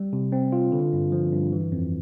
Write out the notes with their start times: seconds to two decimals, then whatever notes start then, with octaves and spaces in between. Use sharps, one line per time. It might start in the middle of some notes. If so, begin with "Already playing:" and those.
Already playing: G3
0.13 C3
0.32 C4
0.52 F4
0.72 D3
0.93 G2
1.12 F3
1.32 G2
1.52 E3
1.72 F2